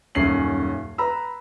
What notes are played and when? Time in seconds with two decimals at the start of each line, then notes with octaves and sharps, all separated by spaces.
0.15 D#1 F#2 C#4 C7 F#7
0.98 B4 A#5 B5 E6